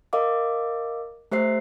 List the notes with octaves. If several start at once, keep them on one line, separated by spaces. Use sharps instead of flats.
A#4 D#5 F5 D6
A3 G4 C5 E5 C7